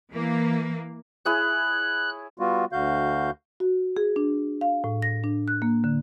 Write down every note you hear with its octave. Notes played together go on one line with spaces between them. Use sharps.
E3 A#3
E4 G#4 C#5 F#6
G3 B3 F4 F#4
D2 D3 F#4 F5 G6
F#4
G#4
D4
F5
A2
A#6
D4
F#6
A#3
D3